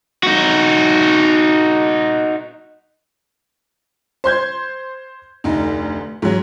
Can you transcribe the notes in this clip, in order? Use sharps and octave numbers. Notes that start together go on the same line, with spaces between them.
D#4 F#4
C5 C6 G6 G#6
F1 D2 D#4
G#2 F#3